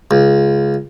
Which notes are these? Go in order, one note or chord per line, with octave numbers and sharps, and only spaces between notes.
C#2